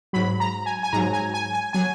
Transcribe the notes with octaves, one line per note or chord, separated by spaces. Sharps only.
G#2 F#3 B5
A#5
G#5
G#5
G#2 F#3 A#5
G#5
G#5
G#5
F#3 G#5